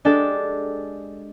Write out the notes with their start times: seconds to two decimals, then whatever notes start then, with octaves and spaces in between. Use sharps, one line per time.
0.05 G#3 D4 G4 A4